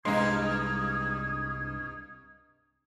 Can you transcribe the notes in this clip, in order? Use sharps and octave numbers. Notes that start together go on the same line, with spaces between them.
C2 G2 G#3 D#4 C6 C#6 D#6 G#6